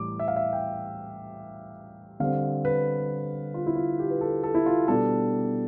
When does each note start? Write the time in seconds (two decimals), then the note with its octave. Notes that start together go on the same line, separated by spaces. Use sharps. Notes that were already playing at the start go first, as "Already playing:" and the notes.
Already playing: A2 E3 G3 D6
0.20 E5
0.28 F5
0.36 E5
0.53 G5
2.20 D3 G3 C4 F5
2.65 B4
3.54 F4
3.67 E4
3.76 F4
3.99 G4
4.10 B4
4.21 A4
4.43 A4
4.55 E4
4.66 F4
4.88 B2 G3 B3 D4 A4